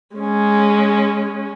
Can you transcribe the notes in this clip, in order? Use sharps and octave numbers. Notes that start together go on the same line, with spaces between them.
G#3 C#4